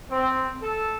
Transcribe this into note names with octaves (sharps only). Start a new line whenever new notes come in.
C4
A4